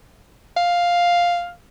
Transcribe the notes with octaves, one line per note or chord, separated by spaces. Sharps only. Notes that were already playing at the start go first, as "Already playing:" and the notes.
F5